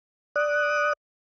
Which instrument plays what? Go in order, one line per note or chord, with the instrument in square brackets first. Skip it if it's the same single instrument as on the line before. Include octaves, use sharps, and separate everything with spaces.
[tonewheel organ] D5 D#6 F#6